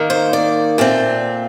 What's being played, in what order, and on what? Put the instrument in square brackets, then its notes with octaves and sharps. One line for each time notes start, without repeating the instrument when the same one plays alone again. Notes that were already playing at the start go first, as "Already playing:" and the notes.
Already playing: [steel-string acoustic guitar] D#3 A#3
C5
D5
A#2 A3 C4